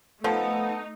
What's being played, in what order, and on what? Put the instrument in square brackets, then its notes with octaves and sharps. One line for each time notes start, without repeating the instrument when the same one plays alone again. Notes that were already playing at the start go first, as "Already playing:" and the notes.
[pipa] F3 [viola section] A3 D#4 [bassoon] B3 [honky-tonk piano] A4